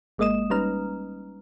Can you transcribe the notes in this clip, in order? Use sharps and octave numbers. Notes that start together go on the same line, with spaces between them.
G#1 G#3 A#3 D#5 D#6 E7
G3 C#4 D#4 B4 A#5 F6